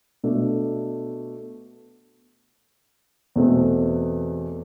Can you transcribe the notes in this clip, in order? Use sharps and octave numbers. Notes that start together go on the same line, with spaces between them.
B2 A3 D4
E2 B2 A3 C4